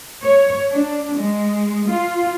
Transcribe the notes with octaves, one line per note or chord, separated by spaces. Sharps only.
C#5
D4
G#3
F4